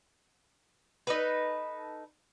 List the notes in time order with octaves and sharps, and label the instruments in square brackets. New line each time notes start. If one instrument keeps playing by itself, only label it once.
[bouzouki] D#4 A4 B4